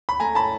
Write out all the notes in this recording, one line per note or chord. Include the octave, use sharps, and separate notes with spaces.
B5
A3 G#5 A#5
A5 B5